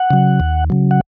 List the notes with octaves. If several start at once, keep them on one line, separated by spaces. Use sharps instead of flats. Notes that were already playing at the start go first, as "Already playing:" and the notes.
Already playing: F#5
C#3 F#3
D#2
C#3 F#3
F#5